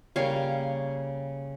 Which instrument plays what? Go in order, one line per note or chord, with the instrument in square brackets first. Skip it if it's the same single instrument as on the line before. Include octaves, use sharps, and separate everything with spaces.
[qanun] C#3 G3 A#3 C#5 F5